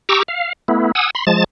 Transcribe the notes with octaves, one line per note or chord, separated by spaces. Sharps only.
G4 A#5 C#6 D6 E6
F5
A3 B3 E4
F#5 G#5 D#6 E6
B5 C6
F3 G#3 A5 A6